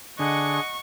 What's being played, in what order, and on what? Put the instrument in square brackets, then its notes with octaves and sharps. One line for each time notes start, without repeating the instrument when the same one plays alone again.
[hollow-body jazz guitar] D3 [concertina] D4 G#4 [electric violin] D#5 F#5 [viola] C#6